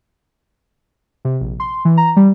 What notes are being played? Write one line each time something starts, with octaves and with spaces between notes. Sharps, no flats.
C3
A#1
C6
E3
A#5
G3